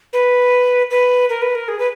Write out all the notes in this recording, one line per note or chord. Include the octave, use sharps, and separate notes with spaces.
B4
B4
A#4
B4
A#4
G#4
B4